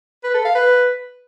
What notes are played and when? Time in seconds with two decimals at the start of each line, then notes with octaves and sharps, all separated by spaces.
0.24 B4
0.34 A4
0.45 F5
0.55 B4